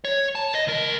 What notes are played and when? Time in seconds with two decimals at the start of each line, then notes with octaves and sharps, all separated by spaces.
0.05 C#5
0.35 A5
0.55 D#5
0.67 C#2 A#4